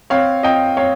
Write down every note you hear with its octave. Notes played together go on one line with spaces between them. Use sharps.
C4 C#5 F5
C4 D#5 G5
C4 C#5 F5